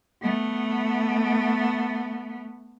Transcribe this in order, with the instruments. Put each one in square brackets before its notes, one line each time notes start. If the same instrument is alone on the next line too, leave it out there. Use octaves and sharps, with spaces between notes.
[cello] A3 B3